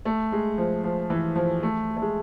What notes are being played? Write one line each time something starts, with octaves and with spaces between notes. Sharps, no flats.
A3
G#3
F3
F3
E3
F3
A3
A3
G#3